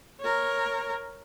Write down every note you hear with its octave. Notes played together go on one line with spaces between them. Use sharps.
A#4 C#5